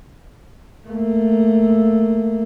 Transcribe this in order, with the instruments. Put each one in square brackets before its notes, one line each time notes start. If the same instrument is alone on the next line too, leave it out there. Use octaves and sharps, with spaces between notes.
[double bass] A3 A#3